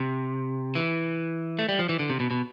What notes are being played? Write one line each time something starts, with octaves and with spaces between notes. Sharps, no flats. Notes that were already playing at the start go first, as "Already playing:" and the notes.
Already playing: C3
E3
A3
G3
F3
E3
D3
C3
B2
B2